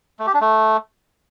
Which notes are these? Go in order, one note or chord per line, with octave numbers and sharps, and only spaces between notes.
A3
G4
D4
A3